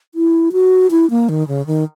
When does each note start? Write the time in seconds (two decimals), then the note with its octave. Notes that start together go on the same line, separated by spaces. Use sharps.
0.15 E4
0.52 F#4
0.91 E4
1.10 A#3
1.29 D#3
1.48 C#3
1.67 D#3